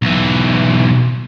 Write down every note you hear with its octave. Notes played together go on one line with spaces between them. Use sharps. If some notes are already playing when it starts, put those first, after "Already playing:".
B1 E3